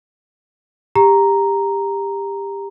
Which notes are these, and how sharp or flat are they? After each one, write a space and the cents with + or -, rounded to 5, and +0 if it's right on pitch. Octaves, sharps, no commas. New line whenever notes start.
G4 +20 A#5 +0